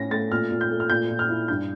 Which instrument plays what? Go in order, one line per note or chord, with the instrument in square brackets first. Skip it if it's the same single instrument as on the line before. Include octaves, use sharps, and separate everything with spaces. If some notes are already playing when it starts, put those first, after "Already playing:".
Already playing: [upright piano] A2 C#4 A#6
A3 A6
A#2 F6
A#2
G6
A3
F6
A#2 G6
A#2
F6
E4
G2 G6